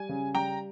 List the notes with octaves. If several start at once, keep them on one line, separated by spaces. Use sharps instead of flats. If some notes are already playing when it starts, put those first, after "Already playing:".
Already playing: G3 G#5
C#3
G3 G5 A#5